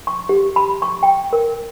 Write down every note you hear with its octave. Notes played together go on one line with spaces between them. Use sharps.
C#6
G4
B5
C#6
G5
A#4